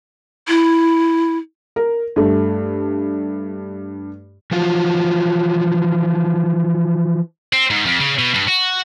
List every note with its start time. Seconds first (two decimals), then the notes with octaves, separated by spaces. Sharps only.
0.48 E4
1.76 A#4
2.16 G2 A3
4.51 E3 F3 F4 F#4
7.53 C4
7.70 G#2
7.86 F2
8.00 C#3
8.18 B2
8.34 G2
8.48 F#4